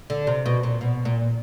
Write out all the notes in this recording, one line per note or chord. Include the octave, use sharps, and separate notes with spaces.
D3
C3
B2
A#2
B2
A#2